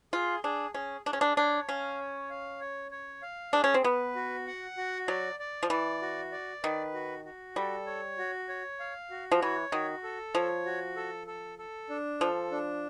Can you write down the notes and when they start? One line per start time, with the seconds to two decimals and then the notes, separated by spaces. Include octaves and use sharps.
0.13 F4 G#4
0.44 D4 G#4
0.74 C#4 G#4
1.06 D4 G#4
1.13 C#4
1.21 D4
1.37 D4 C#5
1.68 C#4 F5
1.99 C#5
2.30 F5
2.61 C#5
2.91 C#5
3.22 F5
3.53 D4 G#4
3.64 C#4
3.74 C4
3.84 B3 B4
4.15 F#4
4.47 F#5
4.77 F#4
5.08 F#3 D5
5.40 D5
5.63 F3
5.70 E3 D5
6.02 F#4
6.32 D5
6.63 D#3 B4
6.94 F#4
7.25 F#4
7.56 G3 A4
7.87 C#5
8.18 F#4
8.49 C#5
8.80 F5
9.11 F#4
9.32 F3
9.42 E3 C#5
9.72 D#3 F#4
10.04 A4
10.35 F3 C#5
10.66 F#4
10.96 A4
11.27 A4
11.59 A4
11.90 D4
12.20 F3 A4
12.52 D4